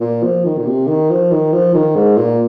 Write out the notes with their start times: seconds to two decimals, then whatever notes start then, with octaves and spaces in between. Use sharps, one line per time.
0.01 A#2
0.24 F3
0.45 D#3
0.58 A#2
0.67 C3
0.87 D#3
1.10 F3
1.31 D#3
1.53 F3
1.75 D#3
1.96 G#2
2.17 A#2